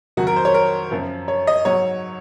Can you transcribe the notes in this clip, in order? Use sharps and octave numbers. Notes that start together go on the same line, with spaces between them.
F2 D#3 F#3 F#4
A#4
C5
C#5
A#4
F#2 F3
C#5
D#5
G#2 F#3 C#5